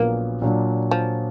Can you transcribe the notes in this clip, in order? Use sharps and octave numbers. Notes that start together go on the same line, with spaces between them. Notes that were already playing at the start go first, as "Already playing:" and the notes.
Already playing: A#1 A#2 F#3 A#3 B3 F4
A#2 F#3 D4 F4
F3